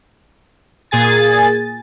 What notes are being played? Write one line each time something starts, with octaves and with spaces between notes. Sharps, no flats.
A#2 G#4 G#5 A6